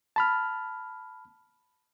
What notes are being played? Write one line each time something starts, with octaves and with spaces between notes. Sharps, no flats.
A5 B5 F6